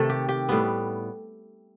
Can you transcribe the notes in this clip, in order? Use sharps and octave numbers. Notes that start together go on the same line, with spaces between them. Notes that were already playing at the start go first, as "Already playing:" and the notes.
Already playing: C3 D#3 A3 A4
G4
G4
A2 G3 B3